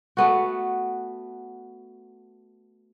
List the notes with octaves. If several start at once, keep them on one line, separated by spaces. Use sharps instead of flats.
A3 B3 F#4